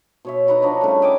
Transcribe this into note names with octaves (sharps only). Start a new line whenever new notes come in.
B2 C#5 E5
D#4 B4 A#5 C#6
F3 D4 D#4 C#5
C#3 G3 A3
D#5 G5 G#5 D6